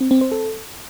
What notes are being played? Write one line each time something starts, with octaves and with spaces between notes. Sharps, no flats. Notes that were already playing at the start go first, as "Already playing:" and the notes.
C4
C4
C5
A4